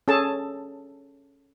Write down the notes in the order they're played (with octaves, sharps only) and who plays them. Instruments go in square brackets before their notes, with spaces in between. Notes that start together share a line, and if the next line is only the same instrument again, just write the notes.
[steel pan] C#4 G#4 A4 A5